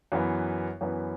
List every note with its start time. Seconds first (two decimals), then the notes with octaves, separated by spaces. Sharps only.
0.12 F#2 E3 B3
0.81 F#2 E3 B3